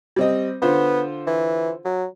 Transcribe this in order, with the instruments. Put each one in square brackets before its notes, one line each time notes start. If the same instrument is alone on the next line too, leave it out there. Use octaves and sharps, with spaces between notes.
[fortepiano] G3 C4 D#5
[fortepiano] D3 F4 C5 [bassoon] B3
[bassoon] E3
F#3